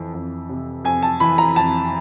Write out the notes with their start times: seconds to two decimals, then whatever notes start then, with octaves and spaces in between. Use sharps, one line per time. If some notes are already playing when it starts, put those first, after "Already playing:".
Already playing: F2 E3
0.14 F2
0.49 C3
0.85 F2 G#5
1.02 A5
1.20 E3 B5
1.38 A#5
1.56 F2 A5